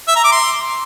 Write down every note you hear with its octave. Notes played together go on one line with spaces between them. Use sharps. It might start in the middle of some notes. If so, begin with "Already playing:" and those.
E5
A#5
D6
C6